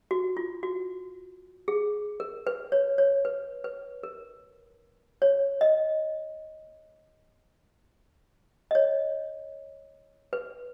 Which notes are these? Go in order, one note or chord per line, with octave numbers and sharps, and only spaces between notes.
F#4
F4
F#4
G#4
A#4
B4
C#5
C#5
B4
B4
A#4
C#5
D#5
D#5
C#5
B4